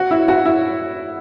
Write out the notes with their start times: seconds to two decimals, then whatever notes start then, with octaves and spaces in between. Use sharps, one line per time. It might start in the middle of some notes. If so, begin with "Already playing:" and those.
Already playing: F#4
0.11 E4
0.28 F#4
0.45 E4